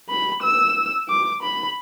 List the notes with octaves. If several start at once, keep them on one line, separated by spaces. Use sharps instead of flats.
B5
E6
D6
B5